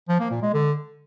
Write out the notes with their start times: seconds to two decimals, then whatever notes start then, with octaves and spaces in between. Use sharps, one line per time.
0.08 F3
0.20 A#3
0.31 A#2
0.42 G#3
0.53 D3